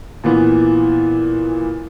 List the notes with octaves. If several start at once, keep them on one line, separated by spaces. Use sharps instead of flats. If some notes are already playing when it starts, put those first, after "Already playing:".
A#2 E3 B3